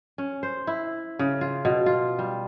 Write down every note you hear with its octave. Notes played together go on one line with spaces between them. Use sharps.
C#4
C5
E4
C#3
F4
B2
F4
G3